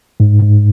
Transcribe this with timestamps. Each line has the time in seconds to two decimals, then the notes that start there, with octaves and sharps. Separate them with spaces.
0.20 G#2
0.42 G#2